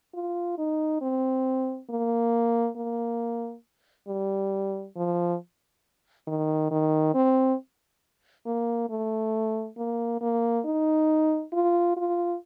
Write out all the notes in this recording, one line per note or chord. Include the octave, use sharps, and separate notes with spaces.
F4
D#4
C4
A#3
A#3
G3
F3
D#3
D#3
C4
A#3
A3
A#3
A#3
D#4
F4
F4